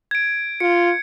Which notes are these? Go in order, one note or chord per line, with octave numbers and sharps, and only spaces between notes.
G#6 D7
F4 C#7